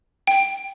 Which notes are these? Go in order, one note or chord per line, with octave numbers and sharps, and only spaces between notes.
G5